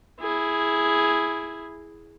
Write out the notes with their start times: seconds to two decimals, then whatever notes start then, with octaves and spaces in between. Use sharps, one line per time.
0.20 E4 G#4